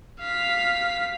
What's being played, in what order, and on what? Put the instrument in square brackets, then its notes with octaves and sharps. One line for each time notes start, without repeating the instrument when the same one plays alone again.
[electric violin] F5 B6